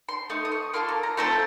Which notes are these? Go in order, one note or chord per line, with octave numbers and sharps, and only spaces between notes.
C6
A3 D#4 D#6
D#6
C#6
A#3 F4 A4 C6
A#5
A#5
A3 C4 F4 A4 A#5